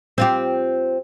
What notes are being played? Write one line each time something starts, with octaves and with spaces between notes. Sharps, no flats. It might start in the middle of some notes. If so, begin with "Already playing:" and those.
C4 F4 G4